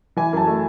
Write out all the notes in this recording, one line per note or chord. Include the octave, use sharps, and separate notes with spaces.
E3 G#5
F#2 A5
A3